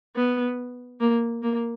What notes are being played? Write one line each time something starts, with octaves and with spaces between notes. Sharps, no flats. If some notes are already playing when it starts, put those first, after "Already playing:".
B3
A#3
A#3